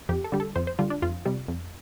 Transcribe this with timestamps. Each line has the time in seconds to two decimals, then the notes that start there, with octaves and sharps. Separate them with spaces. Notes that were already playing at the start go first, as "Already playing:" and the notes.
0.09 F2 G4
0.24 A4
0.32 D3 G3
0.40 A4
0.56 F2 C5
0.67 C5
0.79 D3 G3 F4
0.90 D4
1.02 F2 F4
1.25 C3 G3
1.48 F2